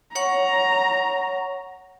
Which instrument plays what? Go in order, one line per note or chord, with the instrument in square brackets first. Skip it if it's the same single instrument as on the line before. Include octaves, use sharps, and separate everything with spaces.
[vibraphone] C#5 F#5 C#6 [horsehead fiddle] A#5